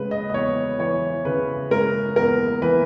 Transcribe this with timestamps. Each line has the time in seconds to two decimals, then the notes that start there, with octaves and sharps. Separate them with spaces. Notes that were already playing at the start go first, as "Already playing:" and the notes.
Already playing: C#3 G#3 B4
0.11 D#5
0.30 D#5
0.34 E2 C#5
0.79 E3 C#5
1.25 C#3 B4
1.71 G#3 A#4
2.16 E2 A#4
2.62 E3 B4